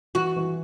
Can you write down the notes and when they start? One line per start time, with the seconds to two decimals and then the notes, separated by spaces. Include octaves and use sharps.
0.15 E3 F#4
0.36 E3